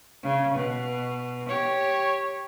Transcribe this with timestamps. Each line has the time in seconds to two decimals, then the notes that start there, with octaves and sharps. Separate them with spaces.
0.23 C#3
0.55 B2
1.49 G4 C#5